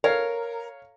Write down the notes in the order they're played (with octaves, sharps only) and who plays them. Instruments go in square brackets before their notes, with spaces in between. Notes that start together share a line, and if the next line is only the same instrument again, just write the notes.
[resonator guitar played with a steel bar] A#4 [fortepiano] C#5 F5